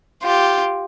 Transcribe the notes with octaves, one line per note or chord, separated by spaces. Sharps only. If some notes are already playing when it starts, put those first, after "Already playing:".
F4 G4